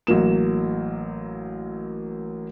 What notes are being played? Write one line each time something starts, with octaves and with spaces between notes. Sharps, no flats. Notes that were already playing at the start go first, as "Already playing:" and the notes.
A1 F#3 A#3 E7